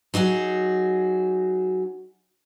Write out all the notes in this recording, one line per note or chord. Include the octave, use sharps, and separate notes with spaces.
F#3 D#4 F#4 G#4